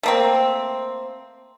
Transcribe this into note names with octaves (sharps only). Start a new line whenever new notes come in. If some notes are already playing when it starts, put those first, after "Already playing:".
A3 A#3 C4